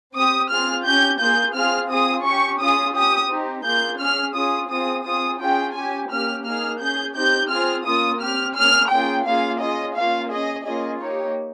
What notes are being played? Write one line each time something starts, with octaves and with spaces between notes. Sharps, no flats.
C4 G4 D#6
C4 F4 G#4 F6
C#4 G4 G6
A#3 F4 G#4 G6
C4 F4 G#4 F6
C4 F4 G#4 D#6
C#4 G4 C#6
C#4 F4 G#4 D#6
C#4 G4 D#6
C4 D#4 G4
A#3 F4 G#4 G6
C#4 G#4 F6
C#4 F4 G#4 D#6
C4 F4 G#4 D#6
C4 F4 G#4 D#6
C#4 F4 G#4 G5
C#4 G4 G#5
A#3 C#4 G4 F6
A#3 D#4 G#4 F6
C#4 G#4 G6
C4 D#4 G4 G6
C4 F4 G#4 F6
A#3 C#4 F4 D#6
C4 G4 F6
A#3 C#4 G#4 F6
A#3 C#4 F4 G#4 G5
A#3 C#4 F4 G#4 F5
C#4 F4 G#4 D#5
A#3 C#4 F4 F5
C#4 G#4 D#5
A#3 C#4 F4 G#4 D#5
A#3 D#4 G4 C#5